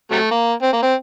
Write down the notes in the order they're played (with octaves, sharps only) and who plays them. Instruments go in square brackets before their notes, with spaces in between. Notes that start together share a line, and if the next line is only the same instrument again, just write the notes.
[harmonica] C3 F#3 A3
A#3
C4
A#3
C4